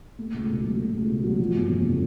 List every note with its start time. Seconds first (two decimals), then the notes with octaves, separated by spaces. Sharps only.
0.18 A3
0.34 C#2
0.49 B2
0.63 F#3
0.78 A3
0.94 C#2
1.09 B2
1.24 F#3
1.40 F3
1.54 G1
1.70 F2
1.85 C#3